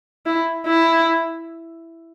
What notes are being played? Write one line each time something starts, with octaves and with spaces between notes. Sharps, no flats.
E4
E4